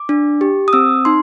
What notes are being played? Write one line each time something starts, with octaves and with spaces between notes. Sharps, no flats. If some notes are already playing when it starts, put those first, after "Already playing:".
Already playing: D6
D4
G4
D#6
C4 E6
D#4 C6